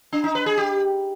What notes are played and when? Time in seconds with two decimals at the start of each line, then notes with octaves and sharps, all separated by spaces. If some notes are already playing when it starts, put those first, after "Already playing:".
0.13 D4
0.24 D#4
0.35 B4
0.46 G#4
0.58 G4